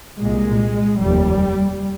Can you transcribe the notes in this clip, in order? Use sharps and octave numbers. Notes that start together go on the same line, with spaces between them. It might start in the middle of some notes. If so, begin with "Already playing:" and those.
C2 A#2 G#3
F1 D#2 G3